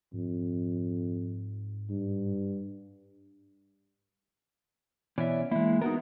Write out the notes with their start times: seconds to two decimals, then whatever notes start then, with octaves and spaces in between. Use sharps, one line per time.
0.13 F2 G#2
1.90 G2
5.18 B2 E3 C#4 D5 E5
5.51 E3 G#3 A#3 E4
5.81 A#3 B3 D#4 F#4 A#4